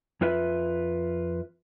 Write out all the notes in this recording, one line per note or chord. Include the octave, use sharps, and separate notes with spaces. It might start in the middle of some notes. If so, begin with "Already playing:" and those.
F2 F4 B4 E5